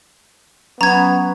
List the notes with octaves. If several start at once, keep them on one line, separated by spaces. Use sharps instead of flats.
F#3 B3 C#4 A#5 G#6